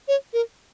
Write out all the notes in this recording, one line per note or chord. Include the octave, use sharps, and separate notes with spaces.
C#5
A#4